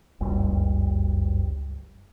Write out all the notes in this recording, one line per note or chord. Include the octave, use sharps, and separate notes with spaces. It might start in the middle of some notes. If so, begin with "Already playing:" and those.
F#1 C#2 G2 G3